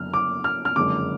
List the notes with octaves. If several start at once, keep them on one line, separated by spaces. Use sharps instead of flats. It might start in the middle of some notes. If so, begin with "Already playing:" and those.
Already playing: F#1 F#2 D3 F6
D6
F6
F6
F#1 F2 D3 G#3 D4 D6